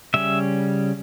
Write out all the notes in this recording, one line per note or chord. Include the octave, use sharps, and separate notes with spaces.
C#3 G3 C#4 E5